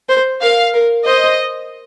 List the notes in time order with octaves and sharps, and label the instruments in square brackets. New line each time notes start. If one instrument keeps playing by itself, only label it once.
[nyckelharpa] C5
[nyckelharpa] A#4 [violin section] F5
[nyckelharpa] A#4
[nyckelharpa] C5 [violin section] D#5